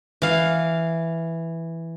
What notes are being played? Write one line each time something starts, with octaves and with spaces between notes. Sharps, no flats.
E3 F5